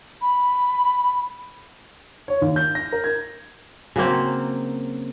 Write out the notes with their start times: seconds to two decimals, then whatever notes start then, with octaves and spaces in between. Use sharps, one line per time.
0.22 B5
2.28 C#5
2.42 D#2
2.56 G6
2.75 A#6
2.92 A#4
3.04 G#6
3.96 C#3 F#3 A#3 C4